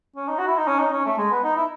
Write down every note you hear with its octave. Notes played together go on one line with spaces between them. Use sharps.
C#4
D#4
F#4
E4
D#4
C#4
D#4
C#4
A3
G#3
B3
D#4
E4